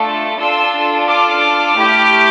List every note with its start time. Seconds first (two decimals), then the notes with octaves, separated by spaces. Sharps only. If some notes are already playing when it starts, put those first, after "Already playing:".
Already playing: A3 D4 F4 A4
0.38 D4 F4 A4 C6 E6
1.08 D6 F6
1.77 A3 E4 G4